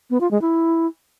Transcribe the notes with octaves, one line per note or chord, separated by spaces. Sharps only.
B3
F4
G#3
E4